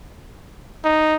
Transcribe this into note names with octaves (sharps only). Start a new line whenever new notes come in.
D#4